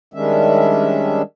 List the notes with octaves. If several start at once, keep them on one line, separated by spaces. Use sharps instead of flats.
D#3 G3 G#3 C#4 D4 E5